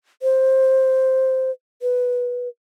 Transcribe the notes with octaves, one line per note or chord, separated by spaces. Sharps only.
C5
B4